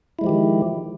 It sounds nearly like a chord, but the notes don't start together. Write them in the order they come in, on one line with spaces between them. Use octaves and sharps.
E4 G#3 F3 G4 D#3